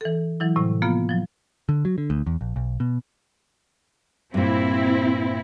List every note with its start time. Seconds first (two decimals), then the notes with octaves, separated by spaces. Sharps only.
0.01 E3 A4
0.40 E3 F#3 E4
0.56 A2 C3 G3
0.82 F3 A#3 B3 F4
1.09 F3 F#3
1.69 D3
1.85 F#3
1.98 D3
2.10 D2
2.26 E2
2.41 A#1
2.56 B1
2.80 B2
4.34 G2 A#2 C4 E4